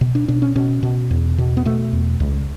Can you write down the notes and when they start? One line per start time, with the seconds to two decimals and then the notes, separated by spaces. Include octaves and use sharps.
0.01 B2
0.15 D4
0.28 B2 D4
0.42 C#4
0.56 B2 C#4
0.83 B2
1.11 E2
1.38 B2
1.57 B3
1.65 B2 A3
1.93 E2
2.20 C#2